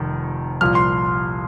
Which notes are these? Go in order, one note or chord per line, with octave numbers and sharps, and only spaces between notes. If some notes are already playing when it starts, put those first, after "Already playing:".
Already playing: F1 F2 D#3
C2 A#2 F3 F6
C6